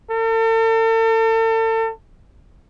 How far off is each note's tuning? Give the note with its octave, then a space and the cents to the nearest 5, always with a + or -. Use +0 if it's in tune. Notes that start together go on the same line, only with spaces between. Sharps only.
A4 +40